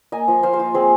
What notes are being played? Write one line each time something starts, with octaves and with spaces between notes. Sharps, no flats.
A#3 D#5 G#5
F3
F3 C5 F5
C5 F5
F4
C4 G#4 C5